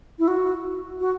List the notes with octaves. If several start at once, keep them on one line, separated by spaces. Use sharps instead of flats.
E4
F#4
F#4